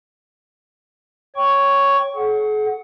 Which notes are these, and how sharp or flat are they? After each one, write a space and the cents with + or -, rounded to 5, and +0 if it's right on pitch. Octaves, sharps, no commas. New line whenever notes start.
C#5 +0 G5 +0 C#6 +0
G#4 +45 F#5 +0